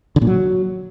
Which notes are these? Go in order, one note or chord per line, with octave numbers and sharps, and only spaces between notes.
D3
A#2
F#3